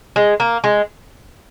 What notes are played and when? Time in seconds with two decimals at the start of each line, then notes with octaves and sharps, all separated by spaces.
0.16 G#3
0.40 A#3
0.64 G#3